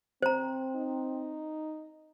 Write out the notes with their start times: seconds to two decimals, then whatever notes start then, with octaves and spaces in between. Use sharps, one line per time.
0.22 C4 C5 A#5
0.76 D#4